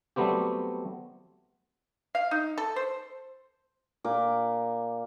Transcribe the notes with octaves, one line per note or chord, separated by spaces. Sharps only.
F#3 G3 A3 B3 C4 G4
F5
D#4
A4
C5
A#2 A#4 D6